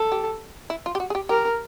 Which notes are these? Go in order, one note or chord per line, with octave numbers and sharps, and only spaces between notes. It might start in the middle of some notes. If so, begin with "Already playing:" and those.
Already playing: A4
G4
E4
F4
G4
F#4
G#4
G4
G4 A#4